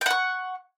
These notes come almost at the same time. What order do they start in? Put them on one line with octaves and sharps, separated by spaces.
G5 F#5 C#6